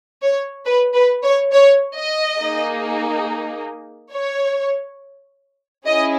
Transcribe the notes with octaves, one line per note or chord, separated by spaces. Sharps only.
C#5
B4
B4
C#5
C#5
D#5
A#3 D#4 G#4
C#5
C#4 E4 G#4 D#5